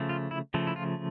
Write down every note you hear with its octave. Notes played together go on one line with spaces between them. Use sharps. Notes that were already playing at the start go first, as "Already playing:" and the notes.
Already playing: C#3 F3 A3
F4
E4
C#3 F3 A3
E4
F4